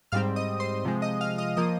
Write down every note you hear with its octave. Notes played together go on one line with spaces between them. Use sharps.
G#2 G3 C4 F5 F6
D#5 D#6
C5 C6
C3 F3 G#3
D#5 D#6
F5 F6
D#5 D#6
F3 A#3 D#5 D#6